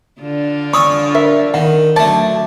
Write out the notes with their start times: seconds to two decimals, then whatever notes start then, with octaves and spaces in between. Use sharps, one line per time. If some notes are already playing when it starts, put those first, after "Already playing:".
0.21 D3 D4 F4
0.73 C#5 G#5 C#6 D#6 E6
1.15 A#4 E5
1.54 D#3 F#5
1.96 D3 F#3 A3 D5 A5